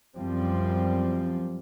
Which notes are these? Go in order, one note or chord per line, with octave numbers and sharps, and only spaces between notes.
F#2 F3 G3 C4